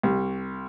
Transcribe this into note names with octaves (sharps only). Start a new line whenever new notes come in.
C2